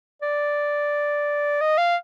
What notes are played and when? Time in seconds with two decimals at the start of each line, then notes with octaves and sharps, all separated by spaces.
0.22 D5
1.61 D#5
1.78 F5